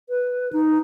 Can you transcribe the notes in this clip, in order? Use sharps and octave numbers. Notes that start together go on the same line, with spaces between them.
B4
D#4